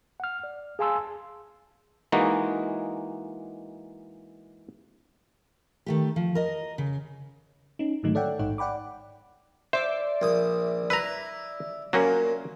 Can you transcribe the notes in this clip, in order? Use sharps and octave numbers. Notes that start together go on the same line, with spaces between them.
F#5 F6
D5
G#4 F5 G#5 A5 C6 E6
E3 G#3 A#3 D#4 F#4
D#3 A3 G4
F3
A#4 D#5
C#3
C#4 D#4
G#2 D3 D#3 F#3 A3 D#4
A4 C#5 D5 E5 F#5 G5
A1 G#2 D#4 C#5 F#5
D5 F#5 G5 B5 D6
C5 D5 E5
A#1 D#6
E4 B4 A#5
A#2 F#3 A#3 C#4